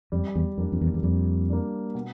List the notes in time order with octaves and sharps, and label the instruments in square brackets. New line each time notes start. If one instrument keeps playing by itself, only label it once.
[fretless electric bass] F2 [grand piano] G3
[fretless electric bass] E2
[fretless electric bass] F2 [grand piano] A#3 D4
[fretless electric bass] F2
E2
E2
[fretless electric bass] F2 [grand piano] G3
[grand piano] A#3 D4
B2